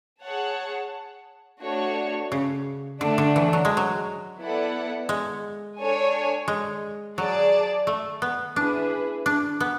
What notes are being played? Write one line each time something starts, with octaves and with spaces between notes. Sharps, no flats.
G#4 C#5 F#5 A5
A3 D4 F#4 C#5
C#3
D3 A3 D4 A4
D3
E3
F#3
G#3
F#3
B3 E4 A4 D5 F#5
G#3
D4 A4 C#5 G#5
G#3
F#3 G#4 D5 A5
A3
B3
D4 E4 G#4 B4
D4
B3